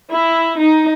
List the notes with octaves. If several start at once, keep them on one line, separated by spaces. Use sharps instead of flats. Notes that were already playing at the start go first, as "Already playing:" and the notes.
E4
D#4